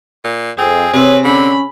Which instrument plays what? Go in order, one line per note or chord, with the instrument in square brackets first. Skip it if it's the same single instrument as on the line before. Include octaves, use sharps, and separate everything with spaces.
[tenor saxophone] A#2
[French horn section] F2 [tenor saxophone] C4 [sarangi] G#4
[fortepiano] C3 C4 [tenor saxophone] B4 [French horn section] C#5
[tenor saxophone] D3 [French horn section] C#4 [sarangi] B5